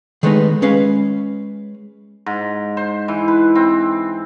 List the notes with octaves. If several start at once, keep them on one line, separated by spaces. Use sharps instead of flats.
D#3 G#3 A3 B3 D4 D#4
G#3 C#4 B4 F5
G#2
C5
E3
B4
C4